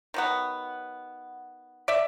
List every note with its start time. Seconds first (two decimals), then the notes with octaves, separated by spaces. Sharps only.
0.14 D#3 F#3 B3
1.88 D5 E5